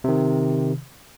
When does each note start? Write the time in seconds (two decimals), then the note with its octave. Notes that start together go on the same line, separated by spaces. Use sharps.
0.04 C3 D#3